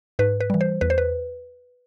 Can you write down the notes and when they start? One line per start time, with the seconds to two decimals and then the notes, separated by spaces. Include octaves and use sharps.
0.19 G#2 B4
0.40 B4
0.50 E3 G3
0.61 C5
0.81 E2 B4
0.90 C5
0.98 B4